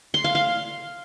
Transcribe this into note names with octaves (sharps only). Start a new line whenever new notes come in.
C6
F5
F5